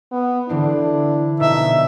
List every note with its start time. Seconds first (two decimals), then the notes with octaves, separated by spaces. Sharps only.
0.11 B3
0.49 D3 E3 C4 D4 E4
1.40 A#1 B2 D#4 E5